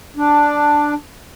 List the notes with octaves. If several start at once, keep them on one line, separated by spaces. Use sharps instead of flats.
D4